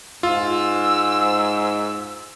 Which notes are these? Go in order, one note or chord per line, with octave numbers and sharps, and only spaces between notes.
G#2 F4 E6